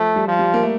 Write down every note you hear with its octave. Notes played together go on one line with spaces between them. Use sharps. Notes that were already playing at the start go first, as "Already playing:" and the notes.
Already playing: F3 A3
G3
F3
G3
A#3
A3